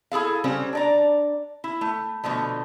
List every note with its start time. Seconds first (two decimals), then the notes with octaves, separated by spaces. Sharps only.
0.12 E4 G#4 A4 F5
0.44 C#3 G3 C4 C#4
0.73 D4 D5 A#5
1.64 E4
1.81 A3
2.24 B2 D3 F3 A3